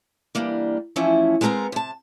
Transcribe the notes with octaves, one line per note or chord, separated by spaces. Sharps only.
E3 G3 A#3 D4
E3 F3 A3 C#4 E4
G#3 B3 C4 F#4 A#4 A#5
C3 A5